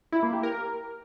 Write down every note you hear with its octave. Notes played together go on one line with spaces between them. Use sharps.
E4
A#3
G4
A#4